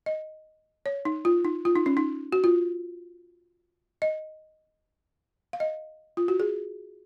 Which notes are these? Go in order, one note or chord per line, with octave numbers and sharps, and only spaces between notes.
D#5
C#5
D#4
F4
D#4
F4
D#4
C#4
D#4
F#4
F4
D#5
F5
D#5
F4
F#4
G#4